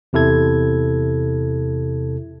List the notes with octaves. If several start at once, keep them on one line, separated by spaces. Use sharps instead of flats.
E2 C3 E4 A4 G#6